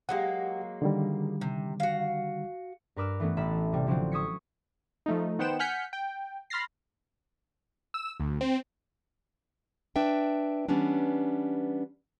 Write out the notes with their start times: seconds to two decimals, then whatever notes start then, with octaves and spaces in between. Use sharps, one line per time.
0.09 F#3 G#3 A#3 G4 F#5
0.82 D3 D#3 G3
1.41 C3
1.80 F#4 F5
2.96 G2 A#4 B4 D6 E6 F6
3.20 E3 A3 B3 C#4
3.37 A1 E5 A5 B5 F6
3.72 C3 G3
3.87 D3 F3 F#3 C4
4.12 C#6 D#6 E6 G#6 B6 C#7
5.06 F3 A3 D#4
5.39 D#3 B3 C5 F#5 G5 E7
5.59 F#5 G#5 F6 G6 B6 C#7
5.93 G5
6.50 B5 C6 F6 A6 A#6 C7
7.94 E6
8.20 D2
8.41 C4
9.96 D4 B4 E5 G5
10.69 E3 G3 B3 C#4 D4